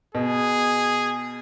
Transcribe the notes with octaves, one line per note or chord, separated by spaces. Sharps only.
B2 G#4